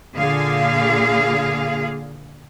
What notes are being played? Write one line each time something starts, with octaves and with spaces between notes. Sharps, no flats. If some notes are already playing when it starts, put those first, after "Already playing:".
A#2 D3 G#4 F5